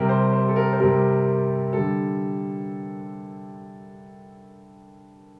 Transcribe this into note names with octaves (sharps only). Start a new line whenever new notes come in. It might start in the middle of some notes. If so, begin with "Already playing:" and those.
Already playing: C3 G3 A#4
C5
C5
A4
A#4
C5
C3 G3 A#4
D3 G3 A4